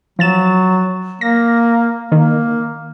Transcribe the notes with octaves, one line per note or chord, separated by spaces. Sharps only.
F3 F#3 A6 E7
A#3 A#6
D#3 A#3